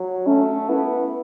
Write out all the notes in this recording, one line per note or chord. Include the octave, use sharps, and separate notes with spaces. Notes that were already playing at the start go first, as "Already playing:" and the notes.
Already playing: F#3
A3 C#4
B3 E4